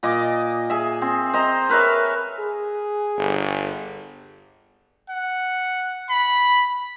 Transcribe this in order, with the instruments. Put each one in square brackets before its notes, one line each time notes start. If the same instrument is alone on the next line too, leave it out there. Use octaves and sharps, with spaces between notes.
[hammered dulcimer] A#2 D#5 D6
G#4 E5
C4
C5 D#5 A#5
A#4 B4 C#5 E5
[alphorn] G#4
[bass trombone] G1
[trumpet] F#5
B5